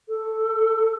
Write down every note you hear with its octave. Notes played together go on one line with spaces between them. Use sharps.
A4